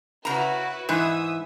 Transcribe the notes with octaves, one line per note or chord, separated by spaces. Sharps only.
C#3 E4 F#4 B4 A#5
G#2 E3 E5 D#6 E6